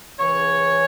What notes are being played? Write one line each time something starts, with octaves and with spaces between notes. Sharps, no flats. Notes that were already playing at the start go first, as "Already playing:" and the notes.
C#2 C#3 E3 C#5